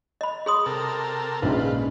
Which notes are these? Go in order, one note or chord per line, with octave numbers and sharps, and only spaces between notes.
D#5 B5
G#4 C6 D#6
C3 A4 A#4
A#1 G#2 C#3 F4 B4